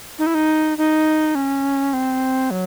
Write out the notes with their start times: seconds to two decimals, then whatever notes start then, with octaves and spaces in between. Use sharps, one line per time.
0.19 D#4
0.26 E4
0.35 D#4
0.78 D#4
1.35 C#4
1.93 C4
2.51 F#3